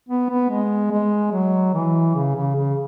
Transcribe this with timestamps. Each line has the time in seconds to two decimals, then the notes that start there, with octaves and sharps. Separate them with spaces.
0.09 B3
0.30 B3
0.50 G#3
0.91 G#3
1.32 F#3
1.74 E3
2.15 C#3
2.35 C#3
2.56 C#3